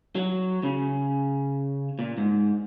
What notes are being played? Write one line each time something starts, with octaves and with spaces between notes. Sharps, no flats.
F#3
C#3
A#2
G#2